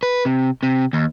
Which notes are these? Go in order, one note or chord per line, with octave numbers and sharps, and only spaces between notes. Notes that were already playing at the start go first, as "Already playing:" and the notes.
B4
C3
C3
D#2